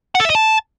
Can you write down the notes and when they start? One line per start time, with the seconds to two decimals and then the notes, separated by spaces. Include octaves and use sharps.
0.15 F#5
0.20 A4
0.25 E5
0.30 D#5
0.35 A5